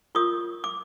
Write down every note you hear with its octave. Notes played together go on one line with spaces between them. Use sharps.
F4 A#4 C#5 C#6 D#6
D6